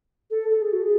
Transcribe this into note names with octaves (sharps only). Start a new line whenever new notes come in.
A4
A4
G#4
F#4
G#4